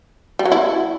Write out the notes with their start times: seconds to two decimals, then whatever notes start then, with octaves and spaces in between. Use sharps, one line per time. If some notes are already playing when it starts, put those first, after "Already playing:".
0.39 G3
0.45 F#3
0.52 E4